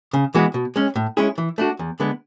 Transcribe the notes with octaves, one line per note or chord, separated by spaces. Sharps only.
C#3
E3 G#3 B3 F#4
B2
G#3 C#4
A2
G#3 C#4 E4 G#4
E3
A3 D4 F#4
E2
D3 G#3 B3